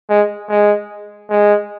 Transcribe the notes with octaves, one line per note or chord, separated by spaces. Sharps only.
G#3
G#3
G#3